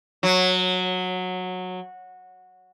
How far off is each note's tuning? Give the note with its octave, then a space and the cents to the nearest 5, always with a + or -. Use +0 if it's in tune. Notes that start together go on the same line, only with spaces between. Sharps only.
F#3 -15